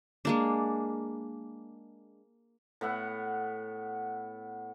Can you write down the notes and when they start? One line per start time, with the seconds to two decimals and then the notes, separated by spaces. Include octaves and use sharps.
0.25 G#3 A#3 D4
2.81 A2 B3 E5 F#5